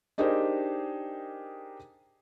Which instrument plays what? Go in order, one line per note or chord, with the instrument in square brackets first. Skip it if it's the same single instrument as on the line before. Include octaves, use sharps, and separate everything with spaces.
[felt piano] D4 D#4 G4 G#4 A#4 C5